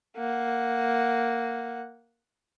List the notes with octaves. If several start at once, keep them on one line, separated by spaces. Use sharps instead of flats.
A#3 F#5